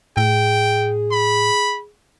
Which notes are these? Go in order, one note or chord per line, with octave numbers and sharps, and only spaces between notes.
A2 G#4 G5
B5